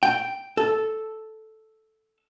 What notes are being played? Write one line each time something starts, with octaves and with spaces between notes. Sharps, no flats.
G5
A4